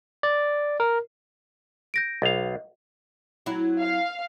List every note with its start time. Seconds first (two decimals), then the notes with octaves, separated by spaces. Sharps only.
0.23 D5
0.80 A#4
1.94 G6 A#6 D7
2.22 B1 D#5 F5
3.46 F#3 C4 E4
3.81 F5